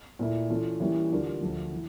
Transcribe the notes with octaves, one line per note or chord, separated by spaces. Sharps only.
A#2 A3 E4
E3 A3 C#4 F4 A4
E3 G3 A#3 C#4 E4
D3 G3 D4 F4 A#4
D2 D3 F3 A3
E3